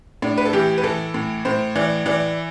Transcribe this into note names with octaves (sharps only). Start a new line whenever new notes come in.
A2 D4
B4
A4
E3 G4
B4
E3 A4
A2
A2 C5
E3 D5
E3 D5